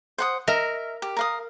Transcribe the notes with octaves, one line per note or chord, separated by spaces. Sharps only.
C5 F#5 D#6
A#4 D#5 E5
G4
A#4 F5 D#6